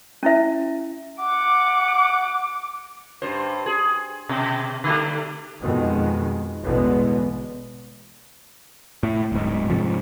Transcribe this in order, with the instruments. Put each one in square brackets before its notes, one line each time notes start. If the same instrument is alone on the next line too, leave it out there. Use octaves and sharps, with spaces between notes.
[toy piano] C#4 E4 E5
[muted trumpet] F#5 [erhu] D6
[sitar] G2 C5
G#4
B2
D3 G3 A3
[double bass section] F2 B2 D#3 G#3
A1 E2 B2 D3 G#3 B3
[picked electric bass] A2
D1 G#2
G#2 C3 F3